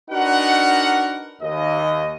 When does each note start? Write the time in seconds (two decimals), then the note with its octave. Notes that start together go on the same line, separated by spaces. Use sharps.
0.11 D4 D#4 F#4 A#4 B4 F#5
1.42 D#2 D#5